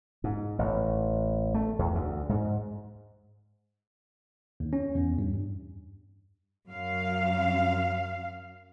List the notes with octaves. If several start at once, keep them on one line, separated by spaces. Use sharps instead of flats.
G#2
A1
A3
E2
D2
G#2
D#2
C#4
E2
G2
F#2 F5